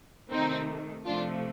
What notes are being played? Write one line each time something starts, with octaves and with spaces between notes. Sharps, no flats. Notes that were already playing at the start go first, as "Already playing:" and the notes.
C3 D#3 A3 C4 D#4
C3 F3 A3 D4 F4